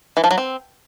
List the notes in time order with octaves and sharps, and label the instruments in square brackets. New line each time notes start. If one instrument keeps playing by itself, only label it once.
[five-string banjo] E3
F3
F#3
C4